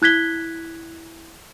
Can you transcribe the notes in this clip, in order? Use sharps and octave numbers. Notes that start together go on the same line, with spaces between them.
E4 F#6 G#6 B6 G7